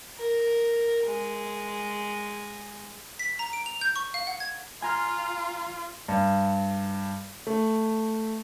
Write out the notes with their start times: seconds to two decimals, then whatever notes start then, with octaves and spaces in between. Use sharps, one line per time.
0.17 A#4
1.07 G#3
3.19 B6
3.39 A#5
3.53 D7
3.66 F7
3.81 G6
3.96 C#6
4.14 F5
4.27 F#5
4.40 G#6
4.82 F4 G#5 A#5 F6
6.08 G2
7.47 A3